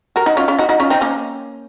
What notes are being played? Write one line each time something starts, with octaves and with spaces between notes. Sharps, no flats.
F#4 A#4
D#4 F#4
C#4 F4
C#4 F4
D#4 F#4
D#4 F#4
C#4 F4
C4 D#4
A#3 C#4